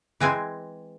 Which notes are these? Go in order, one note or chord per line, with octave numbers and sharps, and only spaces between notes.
E3 G#3 C4 G#5